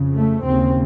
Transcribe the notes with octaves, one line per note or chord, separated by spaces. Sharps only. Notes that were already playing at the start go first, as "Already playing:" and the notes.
Already playing: F2 C#3
A3
D#2 C#3 C4